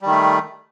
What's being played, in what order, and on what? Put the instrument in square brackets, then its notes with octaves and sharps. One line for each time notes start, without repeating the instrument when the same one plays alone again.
[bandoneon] G3
D#3
A3